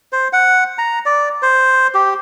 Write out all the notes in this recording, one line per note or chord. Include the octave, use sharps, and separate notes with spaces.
C5
F#5
A#5
D5
C5
G4